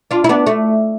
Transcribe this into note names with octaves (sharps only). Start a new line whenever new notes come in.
D4 F4
E4
B3 D4
A3